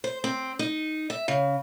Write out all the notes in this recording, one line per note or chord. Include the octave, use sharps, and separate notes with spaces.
C5
C4
D#4
E5
C#3